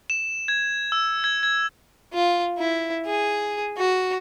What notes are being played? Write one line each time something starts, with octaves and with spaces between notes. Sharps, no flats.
E7
G#6
E6
G#6
G#6
F4
E4
G#4
F#4